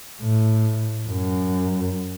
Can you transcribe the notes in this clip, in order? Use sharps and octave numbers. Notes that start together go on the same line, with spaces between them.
A2
F#2